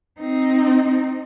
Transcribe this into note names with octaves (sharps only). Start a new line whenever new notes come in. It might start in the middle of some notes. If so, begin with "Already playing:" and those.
C4 D#4